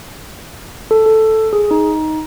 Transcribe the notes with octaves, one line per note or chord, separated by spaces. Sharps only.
A4
A4
G#4
D#4